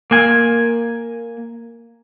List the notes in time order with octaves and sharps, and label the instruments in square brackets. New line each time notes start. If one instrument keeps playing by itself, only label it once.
[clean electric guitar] A#3 G#5